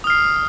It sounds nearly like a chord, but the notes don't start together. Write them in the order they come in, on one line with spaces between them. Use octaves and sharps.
D#6 F6 C7